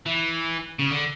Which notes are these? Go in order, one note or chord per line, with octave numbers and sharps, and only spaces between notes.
E3
C#3
D3